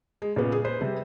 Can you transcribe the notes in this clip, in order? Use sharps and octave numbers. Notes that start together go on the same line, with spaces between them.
G#3
A#2 C#3 B3
G#4
B4 C5
C3 G3